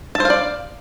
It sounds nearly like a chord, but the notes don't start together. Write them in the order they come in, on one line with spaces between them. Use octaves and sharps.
A5 C5 F5 D5